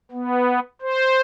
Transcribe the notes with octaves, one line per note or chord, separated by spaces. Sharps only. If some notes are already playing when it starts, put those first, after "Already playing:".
B3
C5